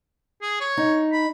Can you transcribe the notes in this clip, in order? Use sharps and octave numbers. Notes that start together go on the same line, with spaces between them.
G#4
C#5
D#4
B5